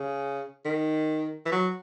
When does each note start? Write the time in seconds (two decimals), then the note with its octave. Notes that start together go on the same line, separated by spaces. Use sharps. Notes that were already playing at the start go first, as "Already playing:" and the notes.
Already playing: C#3
0.65 D#3
1.46 E3
1.52 F#3